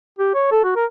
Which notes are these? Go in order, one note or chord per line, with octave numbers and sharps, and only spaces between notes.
G4
C#5
A4
F#4
A#4